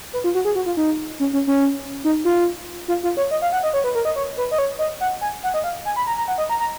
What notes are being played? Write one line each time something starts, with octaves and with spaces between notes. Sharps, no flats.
B4
F4
F#4
G#4
F#4
F4
D#4
C#4
C#4
C#4
D#4
F4
F4
F4
C#5
D#5
F5
F#5
D#5
C#5
B4
A#4
D#5
C#5
B4
D#5
C#5
D#5
F#5
G#5
F#5
D#5
F5
G#5
B5
A#5
A#5
F#5
D#5
A#5
A#5